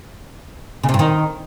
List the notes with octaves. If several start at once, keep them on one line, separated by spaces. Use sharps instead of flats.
C#3
C3
G2
D#3